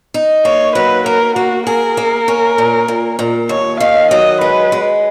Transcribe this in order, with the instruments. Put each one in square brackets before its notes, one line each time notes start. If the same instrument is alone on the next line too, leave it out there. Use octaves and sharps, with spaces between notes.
[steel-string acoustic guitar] D#4
[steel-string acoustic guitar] A#3 [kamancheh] C#5
[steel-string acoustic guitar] F#3 [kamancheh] B4
[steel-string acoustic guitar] A#3 [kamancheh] A#4
[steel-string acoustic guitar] A#3 [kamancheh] F#4
[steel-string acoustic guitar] G#4 [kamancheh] A#4
[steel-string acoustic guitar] A#3
C#4
A#2
A#2
A#2
[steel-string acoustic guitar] D#2 [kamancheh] C#5
[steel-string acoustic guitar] D#3 [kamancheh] F5
[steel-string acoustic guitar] F#3 [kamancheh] D#5
[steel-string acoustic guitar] G#3 [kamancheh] B4
[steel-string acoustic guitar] G#3